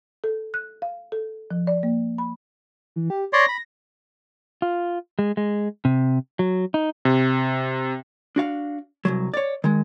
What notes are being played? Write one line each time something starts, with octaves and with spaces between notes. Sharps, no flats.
A4
F#6
F5
A4
F3
D5
A#3
B5
E3
G4
C#5 D5 C6 A#6
B5
F4
G#3
G#3
C3
F#3
D#4
C3
D4 F#4 F5
C2 A2 F#3
C#5 D5
D#3 G#3